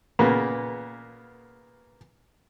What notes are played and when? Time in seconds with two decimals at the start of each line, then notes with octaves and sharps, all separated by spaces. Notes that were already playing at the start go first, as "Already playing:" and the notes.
0.19 A#2 C#3 A#3 B3